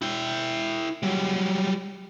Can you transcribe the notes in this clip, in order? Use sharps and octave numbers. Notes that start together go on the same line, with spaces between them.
E4 G5
F#3 G3